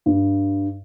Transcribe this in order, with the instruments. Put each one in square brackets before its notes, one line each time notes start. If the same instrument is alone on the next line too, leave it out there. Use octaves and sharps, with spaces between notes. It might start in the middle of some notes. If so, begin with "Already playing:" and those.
[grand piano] G2